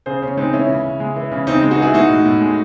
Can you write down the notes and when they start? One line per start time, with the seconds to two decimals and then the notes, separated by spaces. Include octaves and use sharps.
0.06 C#3 G#4 C5
0.22 C#3 C#4
0.37 G#3 C4 D#4
0.53 E3 C#4 E4
0.69 C#3
0.84 C#3
1.00 G#3
1.16 E3
1.32 C#3
1.47 C#3 C4 D#4
1.62 G#3
1.71 D#4 F#4
1.79 E3 E4 G#4
1.94 G#3 D#4 F#4
2.09 A2
2.25 A2
2.41 G#3